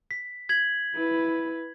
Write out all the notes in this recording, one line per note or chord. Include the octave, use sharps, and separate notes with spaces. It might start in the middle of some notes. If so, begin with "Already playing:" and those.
B6
G#6 B6 F#7
E4 B4